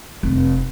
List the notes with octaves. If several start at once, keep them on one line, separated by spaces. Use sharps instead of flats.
F1